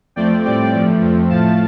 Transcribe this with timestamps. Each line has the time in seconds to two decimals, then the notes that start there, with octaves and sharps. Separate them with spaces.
0.16 F2 F3 A3 C4 D5 G5
0.44 A2 G3 C4 D5 G5
0.73 G2 F3 A3
1.01 F2 F3 A3 C4
1.30 A2 F3 A3 F5 A5